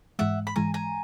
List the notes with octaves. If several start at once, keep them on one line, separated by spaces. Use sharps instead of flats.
G#2 E3 G#3 E5 F#5
B5
G#2 E3 G#3 G#5 A#5
G#5 A#5